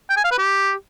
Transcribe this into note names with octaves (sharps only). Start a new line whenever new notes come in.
G5
G#5
F5
B4
G4